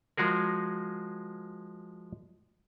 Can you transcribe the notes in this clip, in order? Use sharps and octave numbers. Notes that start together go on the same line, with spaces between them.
F3 G#3 F#4 G#4 A#4